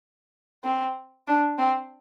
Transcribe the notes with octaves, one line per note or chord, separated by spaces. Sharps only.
C4
D4
C4